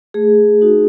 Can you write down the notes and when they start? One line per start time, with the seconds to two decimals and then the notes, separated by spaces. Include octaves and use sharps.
0.14 A3 G#4
0.62 D#4 F#4